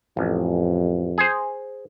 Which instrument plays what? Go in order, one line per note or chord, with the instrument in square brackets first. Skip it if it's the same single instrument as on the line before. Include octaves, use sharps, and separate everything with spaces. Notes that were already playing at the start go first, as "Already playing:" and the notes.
[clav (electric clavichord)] A1 [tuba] F2
[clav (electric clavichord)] G#4 C5